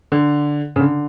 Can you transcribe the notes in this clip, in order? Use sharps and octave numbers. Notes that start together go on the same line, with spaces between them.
D3
C#3
D3